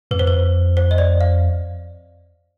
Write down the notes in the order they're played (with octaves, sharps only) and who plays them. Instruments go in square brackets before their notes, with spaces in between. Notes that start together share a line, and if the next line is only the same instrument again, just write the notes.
[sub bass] F2 [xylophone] B4
[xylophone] C5
B4
C5
D#5
D5
F5